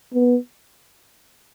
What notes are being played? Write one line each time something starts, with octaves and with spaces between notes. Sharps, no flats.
B3